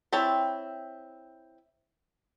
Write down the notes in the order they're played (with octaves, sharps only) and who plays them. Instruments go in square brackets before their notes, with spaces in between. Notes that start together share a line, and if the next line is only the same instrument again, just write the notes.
[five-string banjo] C4 E4 C#5 G5 A5